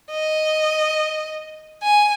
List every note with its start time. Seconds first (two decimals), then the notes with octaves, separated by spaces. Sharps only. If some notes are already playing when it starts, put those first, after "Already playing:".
0.11 D#5
1.83 G#5